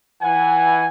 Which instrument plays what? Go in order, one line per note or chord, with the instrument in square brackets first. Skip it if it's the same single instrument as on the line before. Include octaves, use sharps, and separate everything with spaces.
[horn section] E3 F#5 G#5